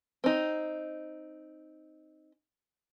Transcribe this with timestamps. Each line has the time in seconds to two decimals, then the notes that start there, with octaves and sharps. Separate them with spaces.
0.24 C4 D#4